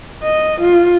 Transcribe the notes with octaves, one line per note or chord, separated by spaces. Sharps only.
D#5
F4